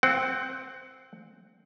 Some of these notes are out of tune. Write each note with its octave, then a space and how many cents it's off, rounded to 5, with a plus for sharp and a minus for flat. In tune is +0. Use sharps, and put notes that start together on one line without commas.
C4 +0 F#5 +25